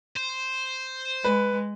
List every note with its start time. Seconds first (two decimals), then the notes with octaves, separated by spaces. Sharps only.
0.17 C5
1.24 G#3 B4